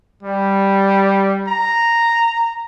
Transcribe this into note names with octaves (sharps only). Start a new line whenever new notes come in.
G3
A#5